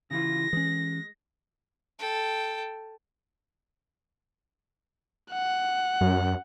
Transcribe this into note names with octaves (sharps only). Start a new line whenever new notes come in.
C#3 E3 F4 A#6
E3 G#3 C#4
A4 G5
F#5
F#2